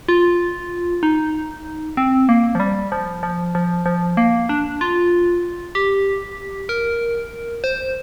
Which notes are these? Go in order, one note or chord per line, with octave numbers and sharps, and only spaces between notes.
F4
D#4
C4
A#3
F3
G3
F3
F3
F3
F3
A#3
D4
F4
G4
A#4
C5